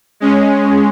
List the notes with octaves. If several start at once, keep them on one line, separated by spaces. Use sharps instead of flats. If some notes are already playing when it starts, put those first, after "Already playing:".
G#3 C#4